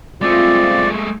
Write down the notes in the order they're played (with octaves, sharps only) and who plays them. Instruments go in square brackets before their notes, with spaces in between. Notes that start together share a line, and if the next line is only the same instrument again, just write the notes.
[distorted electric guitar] G#3 A3 [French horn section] C4 F4 [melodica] D5